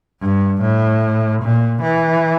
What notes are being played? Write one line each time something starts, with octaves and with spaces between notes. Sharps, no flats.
G2
A2
A#2
E3